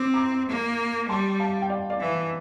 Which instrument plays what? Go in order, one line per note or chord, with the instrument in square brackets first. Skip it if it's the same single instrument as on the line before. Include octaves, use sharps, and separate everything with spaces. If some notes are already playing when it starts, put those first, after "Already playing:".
Already playing: [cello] C4 [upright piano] D6
[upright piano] A#5 D6
[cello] A#3
[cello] G3 [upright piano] A5 C6
[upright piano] F5 A5
G5
D5 F5
D5 F5
[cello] E3